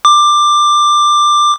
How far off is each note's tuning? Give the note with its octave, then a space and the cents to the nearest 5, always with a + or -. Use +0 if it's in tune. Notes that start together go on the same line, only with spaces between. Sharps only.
D6 +15